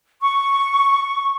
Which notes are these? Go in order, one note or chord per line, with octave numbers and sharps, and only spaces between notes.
C#6